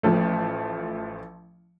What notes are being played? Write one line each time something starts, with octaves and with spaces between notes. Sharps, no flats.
A1 F3 A3